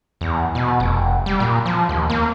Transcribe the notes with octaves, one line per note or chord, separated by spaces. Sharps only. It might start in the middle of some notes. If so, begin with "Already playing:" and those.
E2
B2
F1
G3
A#2
F3
D#2
A#3